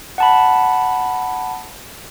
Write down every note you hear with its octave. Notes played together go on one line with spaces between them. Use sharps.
F#5 A5 B5